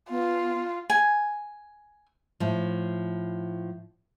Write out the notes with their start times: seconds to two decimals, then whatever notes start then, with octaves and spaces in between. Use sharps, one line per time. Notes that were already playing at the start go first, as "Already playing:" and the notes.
0.10 B3 F4
0.90 G#5
2.40 A2 F3